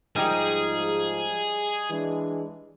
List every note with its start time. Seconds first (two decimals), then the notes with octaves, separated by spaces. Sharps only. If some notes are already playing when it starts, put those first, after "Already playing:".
0.16 G#2 F3 G3 D#4 G4 G#4
1.90 E3 G#3 D4